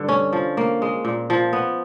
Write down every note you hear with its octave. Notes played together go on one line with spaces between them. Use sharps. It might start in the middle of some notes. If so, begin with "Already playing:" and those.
Already playing: G2 D3
C#4
F3
A#3
G#3
A#2
F3
B3